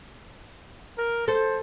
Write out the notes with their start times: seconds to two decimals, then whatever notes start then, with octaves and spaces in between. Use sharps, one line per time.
0.98 A#4
1.28 A4 C5